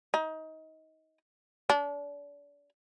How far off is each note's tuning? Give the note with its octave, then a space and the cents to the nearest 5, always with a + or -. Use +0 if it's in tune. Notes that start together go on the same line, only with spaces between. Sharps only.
D#4 +25
D4 -35